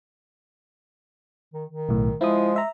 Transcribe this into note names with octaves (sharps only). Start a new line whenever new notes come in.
D#3
D#3
B1 A2
F3 G#3 E4 D#6
E5 A#5